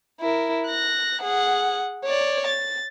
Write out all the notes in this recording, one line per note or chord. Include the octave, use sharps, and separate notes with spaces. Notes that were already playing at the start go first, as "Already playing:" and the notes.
E4 A#4
F#6 A#6
G#4 F#5
C#5 D5
A6